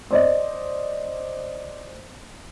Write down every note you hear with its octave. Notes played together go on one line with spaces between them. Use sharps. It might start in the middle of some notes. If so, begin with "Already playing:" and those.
C5 D5 D#5